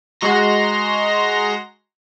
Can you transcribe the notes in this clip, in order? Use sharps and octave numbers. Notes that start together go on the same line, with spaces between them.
G#3 F#4 A#5 C6 A#6